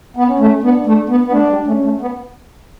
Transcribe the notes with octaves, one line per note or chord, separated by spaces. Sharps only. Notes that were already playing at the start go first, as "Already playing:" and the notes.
B3
C#4
A3
B3 D4
A3
B3
B3
A3 D4
G3
A3 C#4
A3
B3